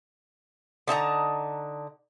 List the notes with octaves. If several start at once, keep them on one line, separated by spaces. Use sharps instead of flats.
D3 D#4 A5 A#5